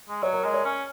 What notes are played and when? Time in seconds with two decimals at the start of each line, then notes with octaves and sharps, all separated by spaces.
0.09 G#3
0.22 F#3 C#5
0.33 A#4
0.43 G#3 D#5
0.54 C#5
0.65 C#4